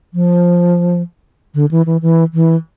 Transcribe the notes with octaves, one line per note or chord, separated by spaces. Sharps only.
F3
D3
E3
E3
E3
E3